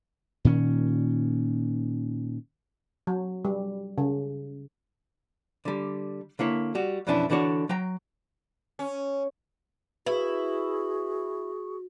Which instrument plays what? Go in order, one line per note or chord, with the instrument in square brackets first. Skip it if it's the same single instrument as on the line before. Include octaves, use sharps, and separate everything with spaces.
[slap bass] A#2 D#3 C#4
[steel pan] F#3
G3
C#3
[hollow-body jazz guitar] D3 G3
D3 A#3 E4 C#5
G3 F#4
F2 B2 E3 C#4 D4 E4
D3 E3 D4 F#4 C#5
F#3 G5 A#5
[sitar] C#4
[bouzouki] E4 [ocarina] F#4 [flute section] G#4 C#6 [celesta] B4